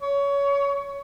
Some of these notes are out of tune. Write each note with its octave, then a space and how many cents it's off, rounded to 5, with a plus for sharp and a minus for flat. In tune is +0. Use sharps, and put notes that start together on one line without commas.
C#5 +20